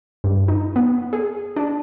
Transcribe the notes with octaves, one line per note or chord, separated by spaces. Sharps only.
G2
D#4
B3
G#4
D4